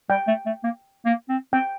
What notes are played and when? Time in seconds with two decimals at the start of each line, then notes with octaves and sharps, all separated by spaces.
0.10 G3 G5
0.28 A3
0.46 A3
0.64 A#3
1.06 A#3
1.29 C4
1.53 C4 G5